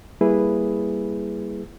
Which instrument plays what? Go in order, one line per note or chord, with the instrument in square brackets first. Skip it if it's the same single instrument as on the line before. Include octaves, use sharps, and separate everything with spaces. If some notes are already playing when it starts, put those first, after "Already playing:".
[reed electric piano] G3 A#3 E4 G#4 B4